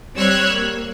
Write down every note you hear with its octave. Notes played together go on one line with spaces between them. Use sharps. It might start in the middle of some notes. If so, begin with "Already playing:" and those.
G3 C4 C#5 E6 F#6 G#6
A#3